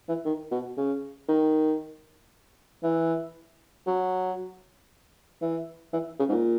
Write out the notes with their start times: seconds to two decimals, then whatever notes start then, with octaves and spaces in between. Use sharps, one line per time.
0.08 E3
0.25 D#3
0.51 B2
0.77 C#3
1.28 D#3
2.83 E3
3.87 F#3
5.42 E3
5.93 E3
6.19 C#3
6.29 G#2
6.32 A#2